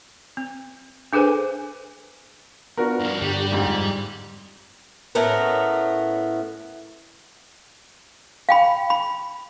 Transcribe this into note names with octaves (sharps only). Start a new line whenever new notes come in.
C4
D4 G#4 A4 B4 C5 G#5
B3 D4 F4 F#4 A#4
G2 F3
G2 D3 G3 G4
F2 G#2
A2 A3 B3 C#4 A#4
F5 G5 B5
B5